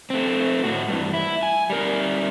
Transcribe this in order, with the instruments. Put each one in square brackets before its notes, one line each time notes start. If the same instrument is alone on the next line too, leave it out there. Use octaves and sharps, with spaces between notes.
[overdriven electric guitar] A3 C4
A2 F#4
G2 E3
E4
G#5
G3 A#4